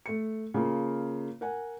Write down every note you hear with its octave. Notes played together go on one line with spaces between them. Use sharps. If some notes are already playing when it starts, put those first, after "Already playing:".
A3 C#7
C#3 A#3 F4
A#4 F#5 G#5